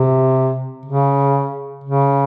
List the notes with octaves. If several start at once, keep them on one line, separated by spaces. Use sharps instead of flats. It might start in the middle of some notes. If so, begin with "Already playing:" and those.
Already playing: C3
C#3
C#3